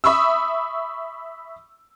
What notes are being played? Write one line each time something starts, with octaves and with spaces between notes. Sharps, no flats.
E5 B5 C#6 D#6 E6